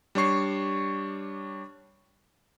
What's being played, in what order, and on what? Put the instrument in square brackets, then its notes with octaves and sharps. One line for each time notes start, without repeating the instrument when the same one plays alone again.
[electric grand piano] G3 D4 C#5 C#6 C7